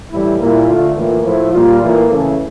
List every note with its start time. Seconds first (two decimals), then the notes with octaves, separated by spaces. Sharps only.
0.11 A2 E3 G3 E4
0.39 A#2 G3 A#3 E4
0.68 D3 A3 F4
0.95 A2 E3 A#3 F4
1.24 A2 F3 A3 E4
1.52 A#2 G3 A#3 F4
1.80 A2 E3 A#3
2.08 C#3 E3 A3 A4